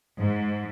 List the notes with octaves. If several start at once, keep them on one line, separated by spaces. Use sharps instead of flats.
G#2